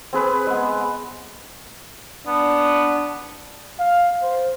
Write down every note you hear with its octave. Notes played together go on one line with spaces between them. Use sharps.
C4 G#4 B4 B5
G#3 B3
B3 D4
F5
C5